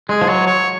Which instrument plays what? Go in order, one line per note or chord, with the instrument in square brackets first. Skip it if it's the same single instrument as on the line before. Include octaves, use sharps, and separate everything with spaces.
[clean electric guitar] G#3 [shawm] G#4
[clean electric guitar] F3
[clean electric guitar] F#3 [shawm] C#5
[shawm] C#5